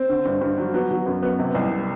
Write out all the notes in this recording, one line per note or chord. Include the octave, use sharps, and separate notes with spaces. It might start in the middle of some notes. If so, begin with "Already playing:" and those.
Already playing: C4
D3
G2
G2
F#3
F#3 B3
F#3
F#2 B3
F#2 B3
C3
C2